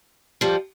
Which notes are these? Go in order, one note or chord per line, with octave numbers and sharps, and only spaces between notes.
F3 G3